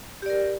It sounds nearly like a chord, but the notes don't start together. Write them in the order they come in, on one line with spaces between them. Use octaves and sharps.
G4 D5 A#4